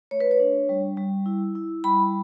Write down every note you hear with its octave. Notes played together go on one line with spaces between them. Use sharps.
A3 C#5
B4
C#5
D4
G3
G3
E4
E4
G3 B5